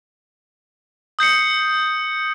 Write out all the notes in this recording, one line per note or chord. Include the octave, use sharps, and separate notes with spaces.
D#6 G6 C7 C#7